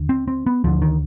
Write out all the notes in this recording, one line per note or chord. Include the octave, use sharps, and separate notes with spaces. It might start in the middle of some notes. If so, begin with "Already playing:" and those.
Already playing: D#2 D3
C4
C4
B3
D2 D3 F3
D#3